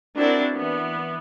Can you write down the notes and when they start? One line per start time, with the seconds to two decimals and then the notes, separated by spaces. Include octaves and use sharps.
0.18 C4 D4 E4 F#4 A#4 D5
0.52 E3 B3